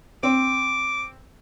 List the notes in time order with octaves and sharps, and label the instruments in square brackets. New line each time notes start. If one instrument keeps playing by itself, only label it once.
[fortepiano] C4 [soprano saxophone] D6